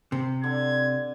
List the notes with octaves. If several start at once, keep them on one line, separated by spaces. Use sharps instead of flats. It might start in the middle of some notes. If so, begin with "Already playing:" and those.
C3
D3 G#6